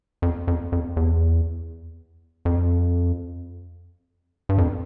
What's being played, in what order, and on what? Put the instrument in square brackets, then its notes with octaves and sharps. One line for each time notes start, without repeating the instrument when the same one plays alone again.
[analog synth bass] F2
F2
F2
E2
F2
G2
F2